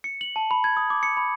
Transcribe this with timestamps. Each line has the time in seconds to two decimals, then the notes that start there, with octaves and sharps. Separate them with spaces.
0.04 C#7
0.21 F#7
0.36 A5
0.51 B5
0.64 G#6
0.77 D#6
0.90 D6
1.03 C#7
1.17 B5